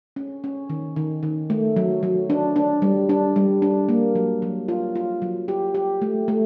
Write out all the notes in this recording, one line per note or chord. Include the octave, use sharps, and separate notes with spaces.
C#4
C#4
D#3
D#3
D#3
A3
F#3
F#3
D4
D4
G3
D4
G3
D4
A#3
F#3
F#3
F4
F4
F#3
G4
G4
A3
A3